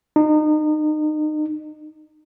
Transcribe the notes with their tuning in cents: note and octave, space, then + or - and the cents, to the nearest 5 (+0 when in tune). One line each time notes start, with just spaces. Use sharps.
D#4 -30